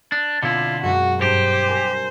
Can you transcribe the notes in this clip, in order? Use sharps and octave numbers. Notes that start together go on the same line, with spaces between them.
D4 D#6
B2 D3 C4 E4 F4
F#2 G#3 F#4
G2 G4 C5
A#4 G#5